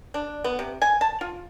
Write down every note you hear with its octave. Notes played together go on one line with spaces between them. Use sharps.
D4
B3
C3
G#5
A5
F4